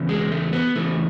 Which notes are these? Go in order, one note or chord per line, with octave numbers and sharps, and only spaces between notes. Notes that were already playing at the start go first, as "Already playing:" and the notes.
Already playing: E2 C#3
G#3
A3
B3
E2 C#3 E3 A3